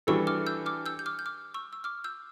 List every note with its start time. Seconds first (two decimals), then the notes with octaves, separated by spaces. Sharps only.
0.07 E3 G3 D4 A4 C#6 E6
0.27 D6 F6
0.46 E6 G6
0.66 D6 F6
0.86 E6 G6
0.99 G6
1.06 D6 F6
1.19 G6
1.26 D6 F6
1.54 C#6 E6
1.73 E6
1.84 D6 F6
2.04 E6 G6